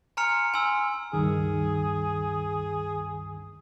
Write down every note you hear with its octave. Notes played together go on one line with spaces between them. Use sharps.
G#5 A#5 C6 F6 C#7 F7
G#5 C6 E6
C#2 G2 D#3 G#4